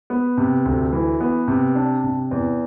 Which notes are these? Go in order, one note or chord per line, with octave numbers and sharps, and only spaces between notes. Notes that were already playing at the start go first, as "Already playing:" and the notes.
B3
C3
D2
E3
B3
C3
D4
C3
E2